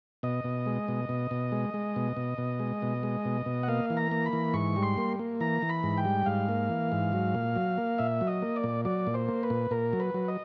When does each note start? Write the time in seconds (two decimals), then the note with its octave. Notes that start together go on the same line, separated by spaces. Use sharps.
0.23 B2 D#5
0.44 B2
0.66 G#3
0.88 B2
1.09 B2
1.31 B2
1.52 G#3
1.74 G#3
1.96 B2
2.17 B2
2.38 B2
2.60 G#3
2.82 B2
3.03 G#3
3.25 B2
3.46 B2
3.63 F#5
3.68 A#3 F5
3.90 E3
3.97 A#5
4.11 A#3
4.26 B5
4.33 E3
4.54 G#2 C#6
4.76 G3
4.83 C6
4.98 A#3
5.19 A#3
5.40 E3 A#5
5.62 E3
5.69 B5
5.83 G#2
5.98 G5
6.05 G3
6.26 G#2 F5
6.49 A#3
6.70 E3
6.92 G#2
7.13 F#3
7.35 A#2
7.56 F#3
7.77 A#3
7.98 A#2 E5
8.21 F#3
8.27 D#5
8.42 A#3
8.56 D5
8.64 A#2
8.85 F#3 D5
9.07 A#2
9.14 C5
9.28 A#3
9.43 B4
9.50 A#2
9.71 A#2 A#4
9.93 F#3
10.00 B4
10.14 F#3
10.28 D#5